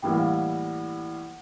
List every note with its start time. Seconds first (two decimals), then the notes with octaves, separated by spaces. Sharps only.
0.02 A2 E3 G3 A#3 G5
0.11 F#5
0.18 F5
0.27 F#5